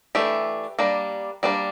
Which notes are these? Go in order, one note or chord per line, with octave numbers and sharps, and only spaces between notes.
E3 A3 D4 G4
G3 A#3 D4
G3 A#3 D4